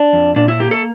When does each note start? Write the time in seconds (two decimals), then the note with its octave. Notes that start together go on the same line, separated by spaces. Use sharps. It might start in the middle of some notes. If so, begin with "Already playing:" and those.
Already playing: D4
0.13 F2
0.36 A#2 D4
0.48 E4
0.60 A#3 G4
0.71 A4